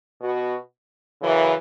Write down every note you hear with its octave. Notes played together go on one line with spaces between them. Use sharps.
B2 B3 F#4
F#2 C#3 E3